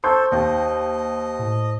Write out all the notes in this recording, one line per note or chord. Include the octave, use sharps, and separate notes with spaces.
A4 C5 A5 C6 C#6 G6
D#2 D#5
A2